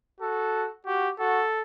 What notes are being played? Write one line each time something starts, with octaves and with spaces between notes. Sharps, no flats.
F#4 A4
F#4 G4
F#4 A4